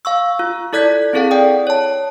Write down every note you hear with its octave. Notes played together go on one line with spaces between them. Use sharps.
F5 C#6 E6
F4
E4 A4 D5 F#6 G#6 B6
C4 E4 G#4 A4 F5 F#5
D5 G5 D#6
C#5 A5